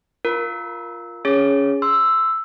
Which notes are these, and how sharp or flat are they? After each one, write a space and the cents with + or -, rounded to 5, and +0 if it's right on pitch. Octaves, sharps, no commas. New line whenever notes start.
F4 +0 A#4 +5
C#4 +15 G#4 +0 C#5 +0
C6 +0 E6 +0